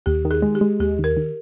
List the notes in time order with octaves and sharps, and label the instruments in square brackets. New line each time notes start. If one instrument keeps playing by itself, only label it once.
[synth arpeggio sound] D#2 [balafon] G4
[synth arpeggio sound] D#3
[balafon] G#4
[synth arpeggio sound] G#3
[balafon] G4
[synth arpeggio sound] G#3
[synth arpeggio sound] D#2 [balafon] G4
[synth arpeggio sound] D#3
[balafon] A#4
[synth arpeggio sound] D#3